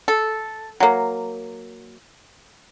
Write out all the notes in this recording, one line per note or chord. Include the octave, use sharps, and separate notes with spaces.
A4
F#3 A#3